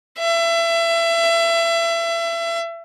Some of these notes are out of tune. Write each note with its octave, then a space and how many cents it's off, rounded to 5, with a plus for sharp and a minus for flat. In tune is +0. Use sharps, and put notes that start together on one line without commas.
E5 +30